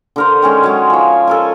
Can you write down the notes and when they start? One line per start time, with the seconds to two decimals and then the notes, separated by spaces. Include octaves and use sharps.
0.16 D3 A#4 C5
0.42 D#3 G#3 C#4
0.63 F#3 G#3
0.90 F3 C#5
1.27 A4 A#4 G#5